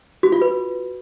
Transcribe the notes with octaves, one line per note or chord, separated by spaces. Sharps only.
F#4
F4
B4